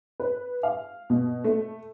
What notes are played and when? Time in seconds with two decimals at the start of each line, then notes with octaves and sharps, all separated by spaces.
0.20 B4
0.63 F5
1.10 B2
1.44 A3